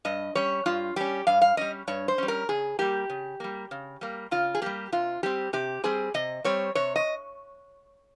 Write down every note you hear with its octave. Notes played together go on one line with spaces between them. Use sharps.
G2 D#5
G3 C#4 C#5
G2 F4
G3 C#4 G4
G2 F5
F5
G3 C#4 D#5
G2 C#5
C5
G3 C#4
A#4
C#3 G#4
G3 A#3 G4
C#3
G3 A#3
C#3
G3 A#3
C#3 F4
G#4
G3 A#3 G4
C3 F4
G3 C4 G4
C3 G4
G3 C4 G#4
C3 D#5
G3 C4 C#5
C3 C#5
D#5